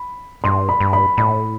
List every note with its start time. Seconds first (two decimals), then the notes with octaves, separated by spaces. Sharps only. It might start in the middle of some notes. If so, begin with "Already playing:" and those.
Already playing: B5
0.44 G2 C6
0.69 B5
0.80 G2
0.93 B5
1.17 A2 B5